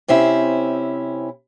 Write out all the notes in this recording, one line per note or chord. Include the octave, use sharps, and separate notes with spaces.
C3 C4 C#4 E4